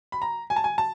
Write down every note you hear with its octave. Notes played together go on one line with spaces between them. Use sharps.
B5
A#5
G#5
A5
G#5
A5